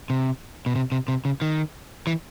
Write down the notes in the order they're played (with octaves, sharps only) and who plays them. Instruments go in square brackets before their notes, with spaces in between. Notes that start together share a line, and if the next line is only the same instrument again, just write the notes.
[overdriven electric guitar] C3
B2
C3
C3
C3
C#3
D#3
E3